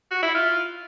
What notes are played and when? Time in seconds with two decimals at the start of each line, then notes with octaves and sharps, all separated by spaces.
0.11 F#4
0.23 E4
0.34 F4